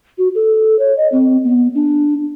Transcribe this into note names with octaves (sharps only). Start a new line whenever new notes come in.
F#4
A4
C#5
D#5
C4
B3
D4